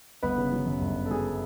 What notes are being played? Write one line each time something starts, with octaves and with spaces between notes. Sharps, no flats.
G1 B3 B4
C#3
F#3
F#2
G1
C#3
A4
F#3 G#4